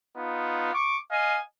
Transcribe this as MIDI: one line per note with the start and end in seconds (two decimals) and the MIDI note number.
0.16 0.70 59
0.16 0.70 63
0.16 0.70 65
0.73 0.97 85
0.73 0.97 86
1.11 1.39 75
1.11 1.39 77
1.11 1.39 80